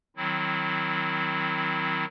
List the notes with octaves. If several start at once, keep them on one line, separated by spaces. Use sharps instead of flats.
D#3 F#3 C4 E4